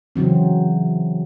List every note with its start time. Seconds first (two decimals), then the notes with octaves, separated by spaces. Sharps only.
0.16 C#3 E3 F#3 C4